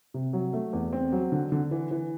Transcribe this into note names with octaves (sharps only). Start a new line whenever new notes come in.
C3
F#3
A3
E2
C4
F#3
D3
D3
E3
E3